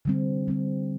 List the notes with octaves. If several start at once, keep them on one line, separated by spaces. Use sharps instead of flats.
D3 G3 C4
D3 G3 C4